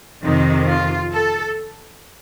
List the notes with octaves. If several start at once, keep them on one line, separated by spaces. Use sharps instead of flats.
F2 C3 D#3 D#4
F4
A4